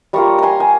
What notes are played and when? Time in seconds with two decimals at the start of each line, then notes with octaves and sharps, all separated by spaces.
0.13 G3 A#3 F4 A#5 C#6
0.38 G#5 A#5 C6
0.60 G#5